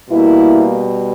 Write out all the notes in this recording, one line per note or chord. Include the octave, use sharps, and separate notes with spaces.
B2 G3 A#3 E4